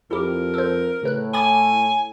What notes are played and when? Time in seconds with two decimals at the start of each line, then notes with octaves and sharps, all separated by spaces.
0.11 F2 E4 G4 A#4
0.54 A4 C5
1.03 A2 C#3 B4 F#6
1.33 G#5 B5 D6 G#6